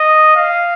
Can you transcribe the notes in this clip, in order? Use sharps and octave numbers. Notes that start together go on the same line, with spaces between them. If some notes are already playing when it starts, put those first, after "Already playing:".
Already playing: D#5
F5